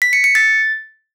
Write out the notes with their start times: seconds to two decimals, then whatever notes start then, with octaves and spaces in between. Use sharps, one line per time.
0.02 B6
0.13 C#7
0.24 C#7
0.35 A6